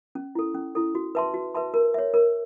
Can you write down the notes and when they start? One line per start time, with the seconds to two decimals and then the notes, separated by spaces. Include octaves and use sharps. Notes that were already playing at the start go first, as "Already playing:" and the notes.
0.15 C#4
0.35 E4 A4
0.55 C#4
0.75 E4 A4
0.95 F#4
1.15 B4 E5 A5 C6
1.34 F#4
1.54 B4 E5 A5 C6
1.74 A#4
1.94 C#5 E5
2.14 A#4